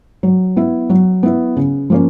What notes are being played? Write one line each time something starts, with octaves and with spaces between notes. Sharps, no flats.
F#3
B3 E4
F#3
B3 E4
C#3
F3 A#3 C#4